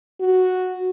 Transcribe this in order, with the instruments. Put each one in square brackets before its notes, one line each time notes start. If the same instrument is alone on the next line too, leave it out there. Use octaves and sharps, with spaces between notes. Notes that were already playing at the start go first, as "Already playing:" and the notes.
[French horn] F#4